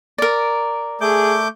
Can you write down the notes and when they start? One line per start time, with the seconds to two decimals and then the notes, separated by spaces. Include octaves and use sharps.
0.18 A#4 D5
1.01 A3 G#4 D6 G6